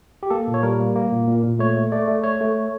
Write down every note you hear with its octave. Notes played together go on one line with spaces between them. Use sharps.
G4
A#3 A4
A#2
C#5
G3 A#4
A#3
A#3
A#2
A#2
A#2
A3 C#5
A3
A3 D5
A3
A3 C#5
A3